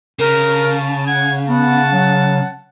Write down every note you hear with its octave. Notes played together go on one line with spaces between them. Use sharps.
C#3 A#4
A5
F#5 G#6
B3 F#5 A5
F#3